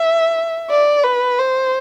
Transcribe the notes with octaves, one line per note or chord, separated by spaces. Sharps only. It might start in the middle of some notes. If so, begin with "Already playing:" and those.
Already playing: E5
D5
B4
C5